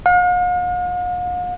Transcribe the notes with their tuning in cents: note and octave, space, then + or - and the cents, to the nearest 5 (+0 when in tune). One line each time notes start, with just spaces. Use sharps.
F5 +45